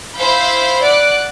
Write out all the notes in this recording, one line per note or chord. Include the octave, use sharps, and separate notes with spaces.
E4 C5 F5 B5 G6 B6
D5 F#5 F#6